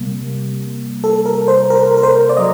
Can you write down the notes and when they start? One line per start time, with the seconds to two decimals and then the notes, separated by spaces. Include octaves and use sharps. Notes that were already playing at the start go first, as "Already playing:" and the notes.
Already playing: C3 G3 A#3
1.04 A4
1.26 A#4
1.48 C5
1.70 A#4
1.97 A#4
2.03 C5
2.29 D5
2.37 F#3 D#5